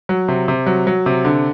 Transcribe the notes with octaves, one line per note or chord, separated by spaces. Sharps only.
F#3
C3
C3
F#3
F#3
C3
D3